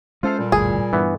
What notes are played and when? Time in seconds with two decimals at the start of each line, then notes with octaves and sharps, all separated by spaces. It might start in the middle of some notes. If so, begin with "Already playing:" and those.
0.23 G#3 C#4 E4 F4 A4 C5 F5
0.38 A#2 G3
0.52 G1 D2 A2 G#4
0.93 G2 E3 B3